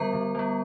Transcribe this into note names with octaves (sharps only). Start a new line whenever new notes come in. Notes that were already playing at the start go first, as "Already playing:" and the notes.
Already playing: D3 G3 B3 A#4 A#5
D3
G3 B3